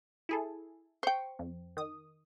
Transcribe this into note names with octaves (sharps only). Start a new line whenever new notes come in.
E4 G#4 A4
C5 G5 C#6
F2
D#3 D#6